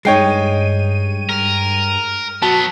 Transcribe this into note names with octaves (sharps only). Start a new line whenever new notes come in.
G2 G#3 D#4 C#5 G5 C7 D#7
A#4
F#3 B3 F#4 A5